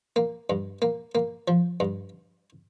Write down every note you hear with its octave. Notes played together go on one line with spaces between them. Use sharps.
A#3
G2
A#3
A#3
F3
G2